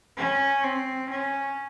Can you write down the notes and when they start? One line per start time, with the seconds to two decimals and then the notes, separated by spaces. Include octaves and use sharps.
0.17 C#4
0.64 C4
1.10 C#4